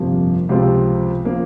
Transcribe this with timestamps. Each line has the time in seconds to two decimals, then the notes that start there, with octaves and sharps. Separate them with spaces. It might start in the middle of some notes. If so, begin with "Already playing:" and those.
Already playing: G1 F2 C3 F3 A#3
0.49 C#2 C3 F3 C4 F4
1.25 F3 A#3 C#4